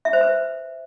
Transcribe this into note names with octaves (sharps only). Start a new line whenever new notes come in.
E5
C5
B4